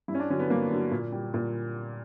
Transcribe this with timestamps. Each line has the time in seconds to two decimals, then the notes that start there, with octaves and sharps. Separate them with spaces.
0.08 G2 E4
0.14 C#4
0.19 D4
0.30 D3 F#3 C#4
0.39 B3
0.50 G2 A#3
0.71 D3 F#3
0.91 A#2
1.12 G3
1.34 A#2